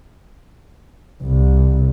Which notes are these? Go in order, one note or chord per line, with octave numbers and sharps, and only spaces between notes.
C2